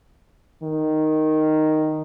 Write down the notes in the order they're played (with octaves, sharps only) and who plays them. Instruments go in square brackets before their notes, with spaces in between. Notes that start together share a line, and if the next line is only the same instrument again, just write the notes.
[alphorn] D#3